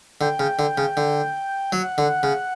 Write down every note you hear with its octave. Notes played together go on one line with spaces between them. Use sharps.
D3 G5
C#3
D3
C#3
D3
F#3 F#5
D3
C#3